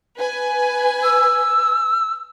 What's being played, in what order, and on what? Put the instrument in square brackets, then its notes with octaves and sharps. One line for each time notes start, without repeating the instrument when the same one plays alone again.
[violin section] B4 G#5
[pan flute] E6